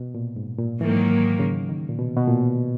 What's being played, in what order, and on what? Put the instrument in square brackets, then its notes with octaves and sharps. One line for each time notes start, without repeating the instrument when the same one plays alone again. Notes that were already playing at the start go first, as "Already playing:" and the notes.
Already playing: [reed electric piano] B2
A#2
G#2
A#2
[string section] G#2 D#3 F#3 A#3 [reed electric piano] E3
[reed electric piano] C#3
D#3
A#2
B2
B2
A#2